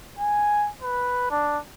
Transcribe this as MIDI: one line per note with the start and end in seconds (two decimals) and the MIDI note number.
0.19 0.69 80
0.82 1.28 71
1.31 1.58 62